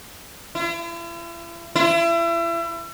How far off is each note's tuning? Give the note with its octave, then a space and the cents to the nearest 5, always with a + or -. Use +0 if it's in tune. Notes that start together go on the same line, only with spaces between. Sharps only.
E4 +45
E4 +35